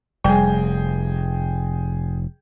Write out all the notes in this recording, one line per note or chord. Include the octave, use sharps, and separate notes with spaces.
F1 G3 G#4 G5